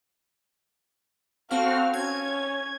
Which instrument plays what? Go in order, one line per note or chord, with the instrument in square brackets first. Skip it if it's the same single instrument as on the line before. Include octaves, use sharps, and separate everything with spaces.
[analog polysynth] C4 F#4 F6 [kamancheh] A4 F5
[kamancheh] C#4 [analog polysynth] G#6